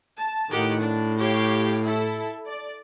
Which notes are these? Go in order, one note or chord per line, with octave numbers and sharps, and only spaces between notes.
A5
A2 D#3 G4 F#5
D4
G4 C#5 F5
E4 A4
D5